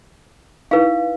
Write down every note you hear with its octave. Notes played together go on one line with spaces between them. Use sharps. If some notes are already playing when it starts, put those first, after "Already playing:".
D#4 E4 B4 F5